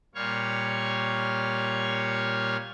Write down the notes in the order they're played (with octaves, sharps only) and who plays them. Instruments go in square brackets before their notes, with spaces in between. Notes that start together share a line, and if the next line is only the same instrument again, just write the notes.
[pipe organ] A#2 G3 C#5 F5 C#6